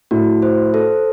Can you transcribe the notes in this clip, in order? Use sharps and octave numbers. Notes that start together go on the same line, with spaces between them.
A2 F#4
C5
A4